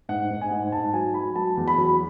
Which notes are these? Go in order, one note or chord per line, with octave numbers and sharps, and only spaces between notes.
G#2 F#5
G#2
G#5
G#2
G#2 A5
F#3 G#5
F#3 B5
F#3 A5
E2
B5
F#3